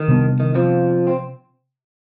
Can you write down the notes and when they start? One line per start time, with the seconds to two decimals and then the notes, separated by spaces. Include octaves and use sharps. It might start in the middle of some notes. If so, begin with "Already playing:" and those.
Already playing: D#3
0.08 C3 G3 B3 D4
0.40 D#3
0.55 F2 F3
1.07 C4